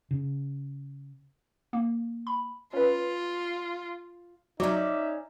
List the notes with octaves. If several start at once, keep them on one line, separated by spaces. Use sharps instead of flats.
C#3
A#3
B5
C#4 F4 B4
F#3 C#4 D#4 D5 E5